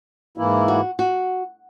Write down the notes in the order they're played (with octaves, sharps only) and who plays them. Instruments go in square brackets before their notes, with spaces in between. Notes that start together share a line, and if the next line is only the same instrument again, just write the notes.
[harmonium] G#2 E3 A#3 E4
[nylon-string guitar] F#4
F#4